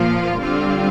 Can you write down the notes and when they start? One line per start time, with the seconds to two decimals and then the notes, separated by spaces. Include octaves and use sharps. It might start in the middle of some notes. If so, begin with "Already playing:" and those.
Already playing: A#2 F3 A#3 F4
0.38 D3 G3 C4 F4